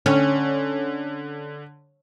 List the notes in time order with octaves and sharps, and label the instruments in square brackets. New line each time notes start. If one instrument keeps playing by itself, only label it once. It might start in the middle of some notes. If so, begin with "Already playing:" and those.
[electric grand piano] D3 [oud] C#4